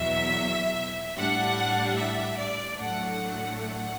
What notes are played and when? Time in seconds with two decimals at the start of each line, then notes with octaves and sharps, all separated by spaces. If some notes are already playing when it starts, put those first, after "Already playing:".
Already playing: E2 B2 F#3 E5
1.16 A2 G3 D4 F#5
1.97 E5
2.38 D5
2.77 A2 F#3 A3 D4 F#5
3.58 F#5